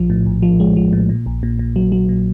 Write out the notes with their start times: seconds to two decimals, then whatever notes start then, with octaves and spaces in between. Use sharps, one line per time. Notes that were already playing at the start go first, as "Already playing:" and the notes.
Already playing: A#1 F3
0.10 A2
0.26 A#1
0.42 F3
0.60 G#3
0.76 F3
0.93 A2
1.09 A#2
1.26 A#1
1.43 A#2
1.59 A#2
1.76 F#3
1.92 F#3
2.09 A#2